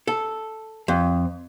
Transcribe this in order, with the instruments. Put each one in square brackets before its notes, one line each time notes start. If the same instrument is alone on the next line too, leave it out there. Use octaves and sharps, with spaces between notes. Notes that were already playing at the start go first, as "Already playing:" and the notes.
[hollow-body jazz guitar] A4
F2